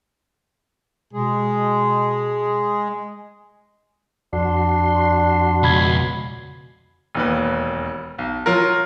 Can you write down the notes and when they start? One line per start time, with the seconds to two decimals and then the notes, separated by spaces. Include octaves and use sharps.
1.13 B2 G#3 G#4
4.33 F2 D4 F#4 C6
5.63 C#2 B2 B5 G#6
7.15 E1 D#2 B4
8.18 B1
8.46 F#3 F4 A#4